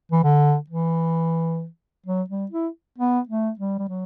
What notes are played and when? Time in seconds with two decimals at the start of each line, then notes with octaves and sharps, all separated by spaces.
0.12 E3
0.24 D3
0.70 E3
2.06 F#3
2.30 G3
2.51 E4
2.98 B3
3.29 A3
3.59 G3
3.79 G3
3.89 F#3